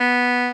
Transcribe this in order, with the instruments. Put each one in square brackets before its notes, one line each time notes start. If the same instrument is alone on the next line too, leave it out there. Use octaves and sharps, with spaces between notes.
[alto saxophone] B3